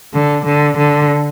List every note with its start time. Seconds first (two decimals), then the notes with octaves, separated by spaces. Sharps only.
0.14 D3
0.46 D3
0.77 D3